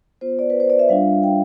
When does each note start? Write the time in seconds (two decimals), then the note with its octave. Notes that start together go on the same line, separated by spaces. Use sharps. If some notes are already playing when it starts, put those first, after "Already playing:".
0.21 B3 F4 C5
0.39 D5
0.50 B4
0.60 C5
0.70 D5
0.79 E5
0.89 G3 D4 F4 F5
1.23 G5